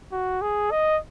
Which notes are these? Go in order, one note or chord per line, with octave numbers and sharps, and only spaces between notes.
F#4
G#4
D#5